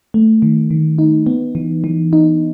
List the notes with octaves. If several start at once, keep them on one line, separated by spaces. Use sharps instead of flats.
A3
D#3
D#3
D#4
B3
E3
E3
D#4